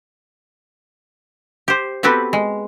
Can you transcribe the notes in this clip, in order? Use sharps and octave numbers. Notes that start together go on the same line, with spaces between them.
G4 C5
B3 C4 F#4 G4 A4 B4
G#3